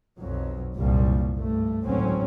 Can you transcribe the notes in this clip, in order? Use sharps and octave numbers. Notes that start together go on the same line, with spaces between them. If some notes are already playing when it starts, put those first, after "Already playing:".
B1 F2 F#3
F#1 C2 A#2 F3 G3
G2 A3
G#1 D2 A2 F#3 C4 C#4